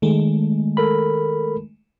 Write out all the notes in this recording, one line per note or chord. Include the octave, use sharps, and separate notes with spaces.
D#3 G#3 A3
A4 A#4 B5